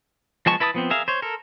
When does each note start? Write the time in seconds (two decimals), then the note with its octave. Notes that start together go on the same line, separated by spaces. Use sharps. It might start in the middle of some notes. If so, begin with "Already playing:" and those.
0.46 F3 G#3 B3 A5 C#6
0.60 E4 B4 A5 A#5 D#6
0.74 F3 B3 C4
0.90 G#4 A#4 E5 F5
1.08 C5 C#5
1.22 A4 A#4